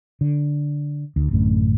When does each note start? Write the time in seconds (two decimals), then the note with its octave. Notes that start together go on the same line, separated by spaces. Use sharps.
0.21 D3
1.16 D2
1.31 A1 F#2 A2 D3